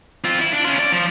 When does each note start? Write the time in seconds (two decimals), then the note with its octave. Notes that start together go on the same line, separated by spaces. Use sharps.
0.25 C4 F4
0.41 E4
0.53 D4
0.66 C#4 F4
0.79 D5
0.92 F3